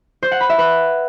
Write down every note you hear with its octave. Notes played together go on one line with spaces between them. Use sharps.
C5
F#5
B5
E5
B4